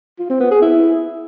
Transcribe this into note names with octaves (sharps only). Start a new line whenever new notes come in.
F4
C4
B3
G#4
E4